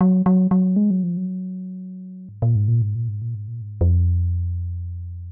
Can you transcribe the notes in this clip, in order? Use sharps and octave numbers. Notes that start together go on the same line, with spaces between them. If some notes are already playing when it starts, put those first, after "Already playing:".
F#3
F#3
F#3
G#3
F#3
F3
F#3
G#2
A#2
G#2
A#2
G#2
A#2
G#2
A#2
G#2
A#2
G#2
F2